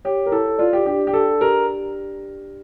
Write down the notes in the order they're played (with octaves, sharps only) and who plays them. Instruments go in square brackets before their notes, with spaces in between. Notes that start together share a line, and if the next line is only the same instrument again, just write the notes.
[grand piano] G4 [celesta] C#5
[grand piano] A#4
[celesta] E4 [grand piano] A4
[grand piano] F4 [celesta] D5
[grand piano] G4
[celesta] D4 [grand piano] G4
[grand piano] G4
[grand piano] A4 [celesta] G5
[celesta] G4 [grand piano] A#4